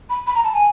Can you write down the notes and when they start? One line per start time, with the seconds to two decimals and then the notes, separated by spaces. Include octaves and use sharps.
0.10 B5
0.27 B5
0.35 A#5
0.44 A5
0.53 G#5